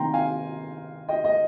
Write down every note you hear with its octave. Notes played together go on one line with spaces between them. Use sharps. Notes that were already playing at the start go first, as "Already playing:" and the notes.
Already playing: C3 D#3 A#3 G5 A#5 C6
F5 G#5
D#5 G5
D#5